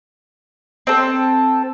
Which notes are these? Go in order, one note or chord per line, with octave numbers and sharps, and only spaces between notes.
C4 A4